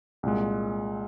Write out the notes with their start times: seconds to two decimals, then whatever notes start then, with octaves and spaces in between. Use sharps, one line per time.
0.23 C2 A#2 G#3